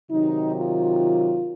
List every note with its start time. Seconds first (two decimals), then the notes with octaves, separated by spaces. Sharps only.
0.11 C3 D#3 F#3 D#4
0.56 F4